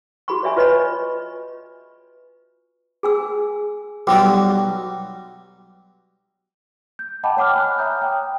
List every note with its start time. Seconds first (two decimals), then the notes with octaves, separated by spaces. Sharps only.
0.28 F#4 G#4 B5 C#6
0.43 C#5 D5 E5 G#5 C#6
0.56 F4 B4 C#5 D#5 B5
3.03 G#4 G#5 E6
4.07 B1 F#3 G3 F#4 G5 D6
6.99 G6
7.23 D#5 F#5 G5 A5 B5 D6
7.37 C#5 F#5 D6 F6
7.53 G#5 B5 F6 F#6
7.79 C#5 E5 A#5 D#6 G6
8.02 G5